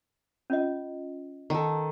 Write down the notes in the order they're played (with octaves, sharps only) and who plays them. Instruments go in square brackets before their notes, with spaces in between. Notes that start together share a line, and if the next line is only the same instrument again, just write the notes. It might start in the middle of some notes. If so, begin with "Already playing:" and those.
[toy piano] C#4 F4 D#5
[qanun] D#3 A4